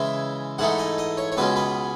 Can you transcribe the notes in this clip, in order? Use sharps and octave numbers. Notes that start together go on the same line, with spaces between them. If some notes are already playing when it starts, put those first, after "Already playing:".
Already playing: C#3 E3 G#3 E5
G#2 E3 A3 D#4 F#5
D#5
D#5
C#5
C#5
C#2 B2 G#3 C#4 B4
B4